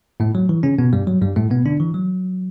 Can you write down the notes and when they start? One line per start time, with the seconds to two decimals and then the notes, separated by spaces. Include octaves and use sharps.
0.20 A2 A3
0.35 F#3
0.49 E3
0.63 C#3 C#4
0.79 B2 B3
0.93 G2 G3
1.07 F#3
1.22 G2 G3
1.36 A2 A3
1.51 B2 B3
1.66 D3 D4
1.80 E3
1.94 F#3